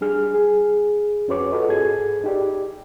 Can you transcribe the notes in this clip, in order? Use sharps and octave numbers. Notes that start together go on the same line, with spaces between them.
G3 D4 G#4 F6
G#4
F2 C#4 F#4 B4 C#5 D6
F4 F#4 A4 B4 D#5
G#2 G#4 A4 G#6
D#4 G4 D5